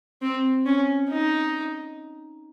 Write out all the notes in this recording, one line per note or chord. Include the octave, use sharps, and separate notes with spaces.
C4
C#4
D#4